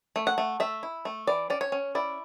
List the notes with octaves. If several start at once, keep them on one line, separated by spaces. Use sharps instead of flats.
A3
F#5
A3
A3 E5
E4
A3
E3 D5
C#4 D5
C#5
C#4
E4 D5